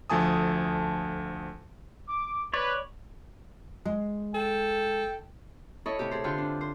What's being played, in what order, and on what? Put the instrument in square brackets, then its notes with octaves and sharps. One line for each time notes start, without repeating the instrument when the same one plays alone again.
[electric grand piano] D2 F3 A3 G#5 A5 D#6
[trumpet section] D6
[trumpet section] B4 [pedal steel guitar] C#5 D5
[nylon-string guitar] G#3
[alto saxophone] A4 [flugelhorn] G5
[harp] E4 A4 C#5 D#5
A2 C3 E4 G4
G#4 A4 C5
D3 F4 G4 G5 C6
D4
C5